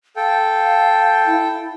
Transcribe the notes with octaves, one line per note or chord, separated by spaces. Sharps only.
A4 F5 G5
E4